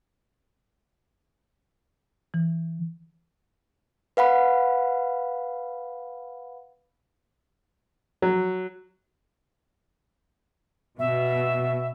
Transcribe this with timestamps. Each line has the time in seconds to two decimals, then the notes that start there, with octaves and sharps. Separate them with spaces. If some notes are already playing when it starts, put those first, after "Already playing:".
2.34 E3
4.17 B4 F5 F#5 B5
8.22 F#3
10.99 B2 E5